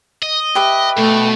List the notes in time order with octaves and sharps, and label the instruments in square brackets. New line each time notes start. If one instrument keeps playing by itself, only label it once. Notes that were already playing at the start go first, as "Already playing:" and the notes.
[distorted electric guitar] D#5
[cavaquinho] G4 B4 E5
[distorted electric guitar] B2 [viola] A3